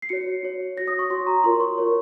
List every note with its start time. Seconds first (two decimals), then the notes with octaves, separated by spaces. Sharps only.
0.02 C7
0.09 F#4 C#5 C#7
0.43 F#4 C#5
0.77 F#4 C#5 A#6
0.88 D#6
0.99 C#6
1.10 F#4 C#5 C6
1.27 A#5
1.44 F4 A#4 C#5 C6
1.60 C#6
1.78 F4 A#4 C#5